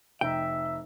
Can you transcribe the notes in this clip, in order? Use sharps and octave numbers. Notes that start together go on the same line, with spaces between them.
F1 D#4 E5 G5 A#5